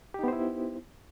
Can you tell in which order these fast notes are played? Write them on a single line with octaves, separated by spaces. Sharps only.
G4 D#4 B3 C5 E4